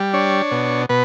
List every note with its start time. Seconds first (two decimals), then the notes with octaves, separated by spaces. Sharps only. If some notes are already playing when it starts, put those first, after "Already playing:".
Already playing: G3
0.13 D4 C#5
0.51 B2
0.89 B2 B4